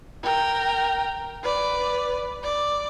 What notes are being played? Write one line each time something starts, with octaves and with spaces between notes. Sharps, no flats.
A#4 G5
B4 D5
D5